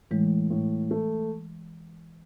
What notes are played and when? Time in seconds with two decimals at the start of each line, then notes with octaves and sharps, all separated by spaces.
0.11 A2 E3 G#3
0.50 A2
0.91 A3